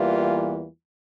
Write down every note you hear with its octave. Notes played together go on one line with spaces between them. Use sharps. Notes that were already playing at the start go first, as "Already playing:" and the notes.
Already playing: E2 E3 G3 A#3 F4